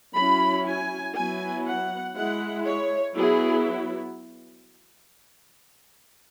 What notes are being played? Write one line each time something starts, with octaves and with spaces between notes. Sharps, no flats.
F#3 C#4 E4 B5
G#5
F#3 B3 E4 G#5
F#5
G#3 E4 F#5
C#5
F#3 B3 E4 G#4